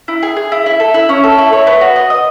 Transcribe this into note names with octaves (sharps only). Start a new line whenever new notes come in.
E4
G#4
G#4
E4
E4
A4
E4
C#4
A4
E4
C#5
B3
F#4
D#5
D#5